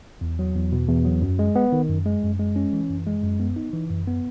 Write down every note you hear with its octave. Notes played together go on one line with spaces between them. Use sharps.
E2
F#3
E2
B2
E2
F#3
F#2
G#3
B3
D#3
F#2
G#3
F#2
G#3
C#4
E3
F#2
G#3
F#2
B3
D#4
E3
F#2
B3